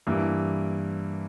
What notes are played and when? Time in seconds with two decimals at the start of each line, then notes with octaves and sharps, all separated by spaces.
0.07 G2 E3 A#3 E4